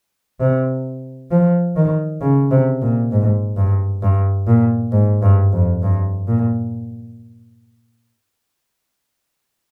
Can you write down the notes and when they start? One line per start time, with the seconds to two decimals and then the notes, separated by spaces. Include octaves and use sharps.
0.41 C3
1.31 F3
1.76 D#3
2.21 C#3
2.51 C3
2.82 A#2
3.12 G#2
3.57 G2
4.02 G2
4.47 A#2
4.92 G#2
5.22 G2
5.52 F2
5.82 G2
6.28 A#2